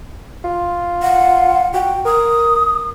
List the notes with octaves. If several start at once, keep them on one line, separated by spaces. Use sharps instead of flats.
F4
F#5
F#4 G5
A#4 D#6